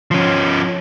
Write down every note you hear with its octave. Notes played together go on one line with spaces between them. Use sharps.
F3 C#4